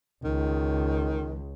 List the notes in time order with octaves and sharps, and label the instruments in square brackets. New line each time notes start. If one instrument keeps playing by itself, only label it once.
[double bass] C#2 [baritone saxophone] D#3